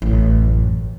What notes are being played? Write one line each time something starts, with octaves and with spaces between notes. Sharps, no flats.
A1 F#2